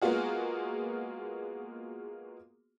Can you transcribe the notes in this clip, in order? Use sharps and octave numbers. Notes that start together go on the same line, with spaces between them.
G#3 A#3 B3 F4 F#4 G#4